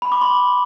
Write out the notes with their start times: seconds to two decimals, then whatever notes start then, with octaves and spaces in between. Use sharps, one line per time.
0.02 B5
0.12 D6
0.21 C6